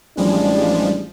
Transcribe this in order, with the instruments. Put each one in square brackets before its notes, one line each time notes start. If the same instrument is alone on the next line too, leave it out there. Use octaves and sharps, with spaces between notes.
[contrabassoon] A1 [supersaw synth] F3 G3 G#3 [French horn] D4